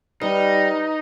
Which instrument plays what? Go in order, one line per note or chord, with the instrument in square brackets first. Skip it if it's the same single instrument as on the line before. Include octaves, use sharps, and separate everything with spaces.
[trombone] G3 [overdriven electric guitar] D#4 [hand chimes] B4